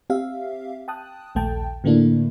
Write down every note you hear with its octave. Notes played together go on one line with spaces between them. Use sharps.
C4 G4 E5 F5
G5 A5 D#6 F#6
A#1 D#2 A3 G5 A5
A2 D3 A3 A#3 D4 E4